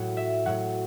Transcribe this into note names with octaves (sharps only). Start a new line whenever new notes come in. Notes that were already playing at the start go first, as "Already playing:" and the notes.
Already playing: A2 F#3 F#5
E5
A2 F#3 F#5